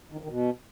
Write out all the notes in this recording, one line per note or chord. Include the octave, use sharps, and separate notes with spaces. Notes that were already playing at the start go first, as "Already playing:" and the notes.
D#3
F2
D#3
B2